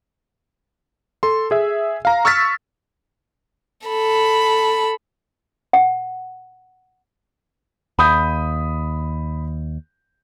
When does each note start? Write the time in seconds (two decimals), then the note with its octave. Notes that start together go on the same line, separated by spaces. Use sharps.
1.23 A4 C6
1.51 G#4 E5
2.05 F5 A#5
2.25 C#6 E6 F6 A6 B6
3.87 A4 B5
5.73 F#5
7.99 D#2 B5 D#6 G6